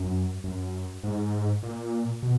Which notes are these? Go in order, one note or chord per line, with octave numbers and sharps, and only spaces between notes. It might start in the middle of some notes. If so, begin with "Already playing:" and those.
Already playing: F#2
F#2
G#2
A#2
B2